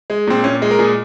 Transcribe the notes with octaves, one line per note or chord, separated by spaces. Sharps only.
G#3
A#2 C4
A#2 C#4
G#3
A#4
A#2 G#4